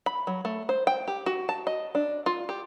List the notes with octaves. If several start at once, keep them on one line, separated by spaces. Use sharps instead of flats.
B5
F#3
A3
C5
G5
G4
F#4
A5
D#5
D4
F4
G4